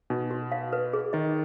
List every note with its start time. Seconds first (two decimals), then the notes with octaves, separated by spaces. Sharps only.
0.10 B2 D#4
0.31 F#4
0.52 F5
0.73 B4
0.93 G#4
1.13 D#3 D#5